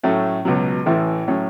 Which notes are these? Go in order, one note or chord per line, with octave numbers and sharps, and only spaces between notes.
A2 F#3 A3 C#4
C#2 B2 F#3
A1 A2 E3
A2 F#3 C#4